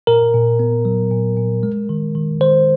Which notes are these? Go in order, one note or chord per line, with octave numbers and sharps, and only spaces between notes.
A#2 A#4
A#2
B3
F#3
A#2
A#2
G#3
D#3
D#3
D#3 C5